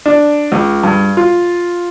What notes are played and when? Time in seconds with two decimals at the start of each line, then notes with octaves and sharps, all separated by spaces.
0.06 D4
0.52 C#2
0.83 G2
1.17 F4